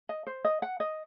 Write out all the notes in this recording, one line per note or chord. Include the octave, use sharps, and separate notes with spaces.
D#5
C5
D#5
F#5
D#5